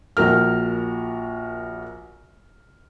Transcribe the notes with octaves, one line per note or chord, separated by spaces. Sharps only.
A#1 F#4 A#4 F6